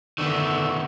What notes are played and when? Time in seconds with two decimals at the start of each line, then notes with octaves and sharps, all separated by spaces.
0.18 D3 D#3 B3 C#6 E6